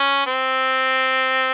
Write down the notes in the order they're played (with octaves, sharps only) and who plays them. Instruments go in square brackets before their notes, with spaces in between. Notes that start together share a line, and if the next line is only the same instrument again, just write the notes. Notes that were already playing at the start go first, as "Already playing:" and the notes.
Already playing: [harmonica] C#4
C4